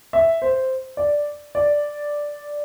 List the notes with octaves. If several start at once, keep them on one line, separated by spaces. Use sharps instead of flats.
E5
C5
D5
D5